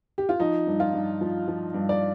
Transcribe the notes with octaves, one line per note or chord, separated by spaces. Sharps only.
G4
F4
F3 D#4
G2
F4
G2
F3
F3
G2
D5